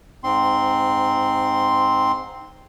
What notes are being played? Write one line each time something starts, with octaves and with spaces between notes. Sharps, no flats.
G#2 C4 C6